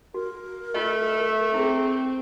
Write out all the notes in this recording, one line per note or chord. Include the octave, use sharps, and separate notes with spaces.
F#4 A#4
A3 F4 D#5 E5
C4 E4 G#4